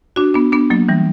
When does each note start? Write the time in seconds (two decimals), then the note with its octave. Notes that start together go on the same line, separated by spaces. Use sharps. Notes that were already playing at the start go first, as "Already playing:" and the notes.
0.16 D4 F#4
0.34 B3 D4
0.52 B3 D4
0.70 F#3 A#3
0.89 E3 G3